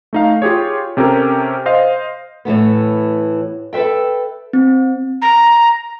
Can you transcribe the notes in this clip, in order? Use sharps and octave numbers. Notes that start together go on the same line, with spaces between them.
A3 D#4 F5
F4 G4 G#4 C#5
C3 C#4 G4 A4 A#4
C5 D#5 F5
A2 E3 A3 B3
A4 B4 C5 E5 G5
C4
A#5